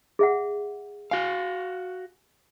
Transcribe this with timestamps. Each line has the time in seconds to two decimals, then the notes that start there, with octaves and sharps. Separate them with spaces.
0.19 G#4 E5 F#5
1.11 F#4 F5 G#5